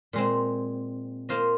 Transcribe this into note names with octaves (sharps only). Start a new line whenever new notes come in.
A#2 G#3 C4
A#3 F4 C5 D#5